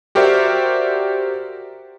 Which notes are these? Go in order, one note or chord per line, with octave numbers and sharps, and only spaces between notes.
F#4 G4 A#4 C5 D5 E5